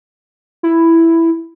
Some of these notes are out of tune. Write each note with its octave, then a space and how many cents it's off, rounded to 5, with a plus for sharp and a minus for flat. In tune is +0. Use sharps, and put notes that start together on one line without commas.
E4 +5